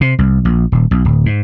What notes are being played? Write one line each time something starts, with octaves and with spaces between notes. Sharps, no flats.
C3
C2
A#1
D#1
B1
D1
G#2